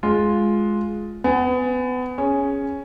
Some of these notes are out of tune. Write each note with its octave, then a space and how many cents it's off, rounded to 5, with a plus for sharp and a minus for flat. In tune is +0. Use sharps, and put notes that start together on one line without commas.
G#3 +10 F4 +0
B3 +30 G#5 -5
C#4 +0 G#4 +0